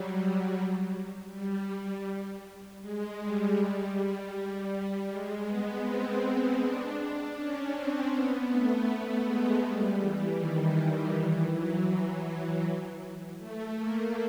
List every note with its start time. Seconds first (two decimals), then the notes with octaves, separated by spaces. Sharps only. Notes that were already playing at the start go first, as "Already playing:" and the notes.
Already playing: F#3 G3
1.31 G3
1.70 G3
2.82 G#3
3.20 G3
3.58 G3
5.09 G#3
5.47 B3
5.84 C4
6.59 D4
6.97 D4
7.35 C#4
7.72 C4
8.11 B3
8.49 A3
8.87 A3
9.23 G#3
9.62 G3
9.99 E3
10.37 D#3
10.74 E3
11.12 E3
11.51 F#3
13.39 A3
13.77 A#3